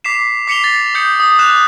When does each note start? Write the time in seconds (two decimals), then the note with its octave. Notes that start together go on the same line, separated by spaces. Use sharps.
0.04 D6 B6 C7 E7
0.47 D6 B6 C#7 E7 F7 G7
0.64 A6
0.94 D#6 G6 C#7
1.20 D#6
1.39 D6 F#6 E7 F7